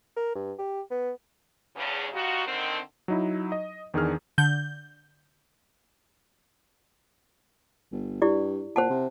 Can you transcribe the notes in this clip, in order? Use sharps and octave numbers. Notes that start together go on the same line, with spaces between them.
A#4
G2
G4
B3
E2 G2 C#3
G3 D#4 F4 F#4
D3 D#3 C4
F#3 D#4 E4
D#5
E2 D#3 D4 G#4 F6
D3 G6
G1
G2 E4 G4 D5
A#2 C5 F#5 A5
C3